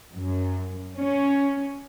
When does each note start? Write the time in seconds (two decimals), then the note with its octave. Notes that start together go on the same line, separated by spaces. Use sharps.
0.15 F#2
0.98 C#4